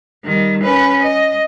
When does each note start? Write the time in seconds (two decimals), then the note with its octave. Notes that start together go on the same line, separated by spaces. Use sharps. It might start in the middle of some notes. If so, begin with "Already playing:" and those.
0.25 D#3 G3
0.62 C#4 B4
1.03 D#5